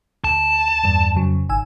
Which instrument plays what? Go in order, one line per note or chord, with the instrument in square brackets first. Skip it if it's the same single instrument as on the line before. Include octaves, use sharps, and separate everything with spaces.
[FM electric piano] D2 [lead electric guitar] A5
[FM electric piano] E2 G2
F2 C#3 F#3
G#1 G#5 E6